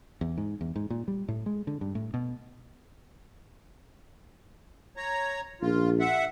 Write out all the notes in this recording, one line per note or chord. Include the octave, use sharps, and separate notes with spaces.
E2
G#2
E2
G#2
A#2
G3
A2
G#3
D3
G2
A2
B2
C#5 A#5
A#1 F4
E5 F#5